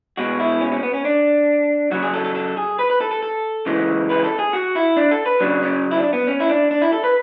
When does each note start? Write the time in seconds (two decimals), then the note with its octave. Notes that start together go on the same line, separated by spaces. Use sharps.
0.17 B2 G#3 F#4
0.40 E4
0.61 C#4
0.72 C#4
0.83 B3
0.94 C#4
1.05 D4
1.91 C#3 F#3 F#4
2.02 G#4
2.14 A4
2.25 A4
2.35 A4
2.57 G#4
2.79 B4
2.90 B4
3.01 A4
3.11 A4
3.23 A4
3.66 C#3 E3 G#3
4.10 B4
4.24 A4
4.39 G#4
4.53 F#4
4.75 E4
4.97 D4
5.11 A4
5.26 B4
5.40 C#3 F#3 D4
5.62 C#4
5.91 E4
5.98 D4
6.13 B3
6.27 C#4
6.40 E4
6.49 D4
6.71 D4
6.82 E4
6.93 A4
7.04 B4